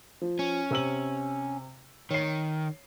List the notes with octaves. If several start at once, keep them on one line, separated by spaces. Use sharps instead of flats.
F3
C#4
C3 E6 F#7
D#3 C#5 C7